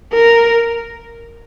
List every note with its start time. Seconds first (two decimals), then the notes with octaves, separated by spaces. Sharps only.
0.14 A#4